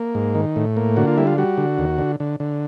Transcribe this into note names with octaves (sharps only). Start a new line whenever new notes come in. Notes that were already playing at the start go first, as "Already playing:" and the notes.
Already playing: A#3
G#2
D#3
A2
A#3
D3 F#4
F4
G3 E4
F4
G3 F#4
D3
D#2
D3
D3
D3